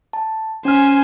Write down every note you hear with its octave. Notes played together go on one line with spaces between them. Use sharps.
A5
C#4 C5 G#5 F6